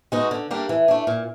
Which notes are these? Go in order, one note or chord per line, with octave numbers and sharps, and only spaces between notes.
G#3 B3 D#4 F#4
D3
G3 A#3 D4
E3
A3 D4
A#2